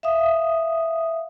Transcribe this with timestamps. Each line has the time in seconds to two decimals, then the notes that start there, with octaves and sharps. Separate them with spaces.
0.03 E5 F5 D#6